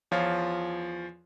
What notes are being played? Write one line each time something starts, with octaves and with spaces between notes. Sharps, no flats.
E2 F3 F4 C#5 F5